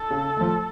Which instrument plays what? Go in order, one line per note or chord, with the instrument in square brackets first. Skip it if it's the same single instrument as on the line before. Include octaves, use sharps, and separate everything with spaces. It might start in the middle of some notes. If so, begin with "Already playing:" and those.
Already playing: [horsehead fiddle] A4
[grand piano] C#3
F3 A3